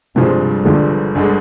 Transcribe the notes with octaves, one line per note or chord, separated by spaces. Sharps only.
G1 G2 C3 F3 G#3
G1 G2 D3 F3 G#3
G1 D3 G#3